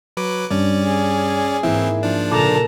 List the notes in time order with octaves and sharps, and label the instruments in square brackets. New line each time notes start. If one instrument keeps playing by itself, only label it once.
[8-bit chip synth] F#3 B4 D6
[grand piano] G2 [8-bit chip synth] C#4 D5
[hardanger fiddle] G#4
[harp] G#2 A#3 [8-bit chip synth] E3 C4 [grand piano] E4
[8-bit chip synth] F3 D4
[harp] A#2 C#3 [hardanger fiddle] A4 A#5 [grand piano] D6